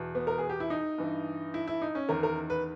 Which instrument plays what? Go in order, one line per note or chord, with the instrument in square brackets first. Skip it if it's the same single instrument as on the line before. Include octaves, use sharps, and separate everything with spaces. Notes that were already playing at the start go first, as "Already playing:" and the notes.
Already playing: [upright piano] E2 B2
B3
A#4
G#4
G4
E4
D#4
G2 E3
E4
E4
D#4
C#4
E2 D#3 A#4
A#4
B4